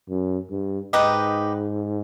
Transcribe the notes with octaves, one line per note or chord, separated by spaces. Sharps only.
F#2
G2
G#2 D#4 G4 B4 D#5